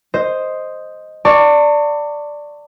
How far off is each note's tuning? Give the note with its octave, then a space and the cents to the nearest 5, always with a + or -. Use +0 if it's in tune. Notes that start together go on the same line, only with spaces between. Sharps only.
C5 +0 D#5 +0
D5 +0 A5 +40 C#6 -10